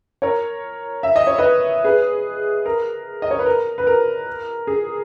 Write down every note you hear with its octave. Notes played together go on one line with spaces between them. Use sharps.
A#4 C#5
E5
D#5
C#5
B4 D#5
G#4 B4
A#4
D#5
C#5
B4
A#4
B4
A#4
G#4